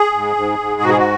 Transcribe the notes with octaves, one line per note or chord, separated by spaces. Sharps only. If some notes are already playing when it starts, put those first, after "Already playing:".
Already playing: G#4
G#2
G#2
G#2
B2 F#4
G#4
F#4